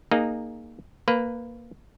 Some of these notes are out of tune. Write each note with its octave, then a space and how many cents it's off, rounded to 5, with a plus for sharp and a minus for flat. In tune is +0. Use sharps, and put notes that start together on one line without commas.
A#3 +0 D#4 -15 G#4 +0
A#3 +0 B4 +10